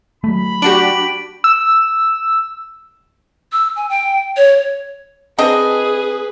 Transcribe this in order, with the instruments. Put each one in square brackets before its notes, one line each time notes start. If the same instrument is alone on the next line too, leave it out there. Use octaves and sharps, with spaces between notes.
[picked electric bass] F#3 A3 [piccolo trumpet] B5
[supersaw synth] D4 F#4 G4 [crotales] D7 F#7
[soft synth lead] E6
[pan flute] E6
G#5
G5
C#5
[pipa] C4 D4 D#5 [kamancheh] G#4 [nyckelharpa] B4